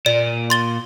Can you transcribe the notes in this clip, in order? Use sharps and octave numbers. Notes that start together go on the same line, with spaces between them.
A#2 D5
C6 A6 G7